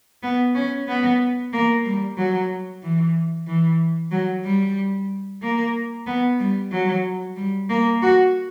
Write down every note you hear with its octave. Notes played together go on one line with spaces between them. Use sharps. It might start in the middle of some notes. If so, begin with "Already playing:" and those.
B3
C#4
B3
A#3
G3
F#3
E3
E3
F#3
G3
A#3
B3
G3
F#3
G3
A#3
F#4